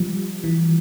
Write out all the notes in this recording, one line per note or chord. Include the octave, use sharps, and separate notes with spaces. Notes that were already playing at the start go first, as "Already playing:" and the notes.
Already playing: F3 G3
E3